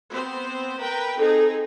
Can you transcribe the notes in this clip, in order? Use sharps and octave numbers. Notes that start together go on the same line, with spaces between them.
B3 C4 C5
A#4 B4 G5
C4 D#4 G#4 A4